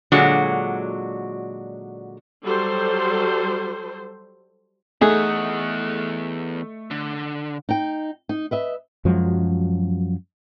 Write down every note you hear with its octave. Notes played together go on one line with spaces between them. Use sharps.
A#2 D3 F#3 G#3 F#4
F#3 G3 A4 C5
E2 A3 D#4 G#4 F#5
D3
D#4 G5
D#4
B4 D#5 E5
F#2 F3 F#3 G#3